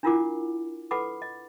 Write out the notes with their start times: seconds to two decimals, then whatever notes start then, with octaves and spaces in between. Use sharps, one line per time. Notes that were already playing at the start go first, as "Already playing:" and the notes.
0.03 D4 E4 F4 A#4 F#5 D6
0.91 A4 B4 F#5 B5 D6
1.22 D#5